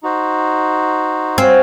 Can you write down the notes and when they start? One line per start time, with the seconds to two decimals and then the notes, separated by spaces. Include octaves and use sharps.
0.03 D#4 F#4 C5
1.37 C4 F#4 C#5 F5 G#5